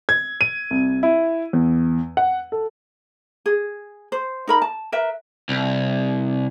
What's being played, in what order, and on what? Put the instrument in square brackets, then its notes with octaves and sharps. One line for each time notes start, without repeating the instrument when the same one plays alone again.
[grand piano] G#6
D#7
C2
E4
E2
F#5
A4
[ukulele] G#4
C5
D#4 A#4 B5
A5
A#4 B4 E5
[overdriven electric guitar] C2